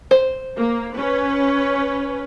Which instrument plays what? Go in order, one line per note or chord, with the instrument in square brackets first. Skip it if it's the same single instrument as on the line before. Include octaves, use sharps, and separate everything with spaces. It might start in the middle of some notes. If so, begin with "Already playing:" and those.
[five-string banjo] C5
[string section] A#3
C#4 B4